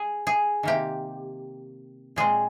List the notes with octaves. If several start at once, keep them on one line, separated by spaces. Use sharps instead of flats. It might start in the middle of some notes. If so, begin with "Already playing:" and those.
Already playing: G#4
G#4
C3 D#3 A#3 G4
A#2 G#3 C4 G#4